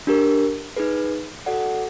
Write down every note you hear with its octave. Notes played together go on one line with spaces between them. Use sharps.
D4 G4 A#4
D#4 G#4 B4
F#4 A4 D5 F#5